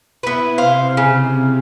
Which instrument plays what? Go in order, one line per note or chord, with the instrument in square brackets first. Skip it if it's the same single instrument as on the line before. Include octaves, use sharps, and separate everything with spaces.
[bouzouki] B3 B4 [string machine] E4
[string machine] C3 [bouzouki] C5 F5
[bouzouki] C#3